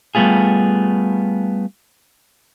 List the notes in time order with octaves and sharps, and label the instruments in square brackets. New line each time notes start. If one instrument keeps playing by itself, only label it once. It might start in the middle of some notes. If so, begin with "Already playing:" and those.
[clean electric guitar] G3 A3 B3 F4 G#4